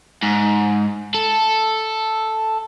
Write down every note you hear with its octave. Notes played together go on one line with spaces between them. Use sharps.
G#2
A4